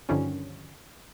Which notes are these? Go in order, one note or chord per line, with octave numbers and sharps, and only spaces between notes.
G2 D3 D#3 F3 G3 C#4